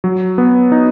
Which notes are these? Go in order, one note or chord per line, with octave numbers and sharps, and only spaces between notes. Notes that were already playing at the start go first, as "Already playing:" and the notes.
F#3
B3
D#4